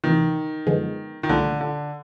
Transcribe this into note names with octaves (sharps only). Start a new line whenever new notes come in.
D2 C3 D#3 E3
F#2 D3 F3 G#3 B3
D#3
C2 A#2 D3 F3 A3
D3